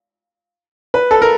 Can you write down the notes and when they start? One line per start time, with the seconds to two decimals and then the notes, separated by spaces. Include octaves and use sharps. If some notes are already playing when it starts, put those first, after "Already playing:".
0.94 B4
1.11 A4
1.22 A#4